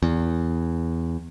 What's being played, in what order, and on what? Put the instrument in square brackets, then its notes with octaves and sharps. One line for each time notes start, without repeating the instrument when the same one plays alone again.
[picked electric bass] E2